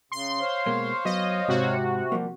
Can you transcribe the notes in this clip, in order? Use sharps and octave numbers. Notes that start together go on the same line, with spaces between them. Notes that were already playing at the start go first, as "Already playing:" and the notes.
C#3 C6
C5 C#5 F5
B2 G#3 A#3
F#3 B3 D#5
G#2 C3 F#4
F3 G3 A#3